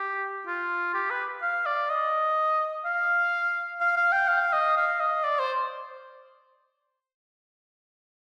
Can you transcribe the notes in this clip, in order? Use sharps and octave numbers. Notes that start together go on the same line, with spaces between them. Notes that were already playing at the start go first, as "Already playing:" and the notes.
Already playing: G4
F4
G4
B4
F5
D5
D#5
F5
F5
F5
G5
F5
D#5
F5
D#5
D5
C5